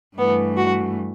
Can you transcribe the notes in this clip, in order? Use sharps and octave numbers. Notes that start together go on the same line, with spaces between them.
G2 E3 A3 B3
F#4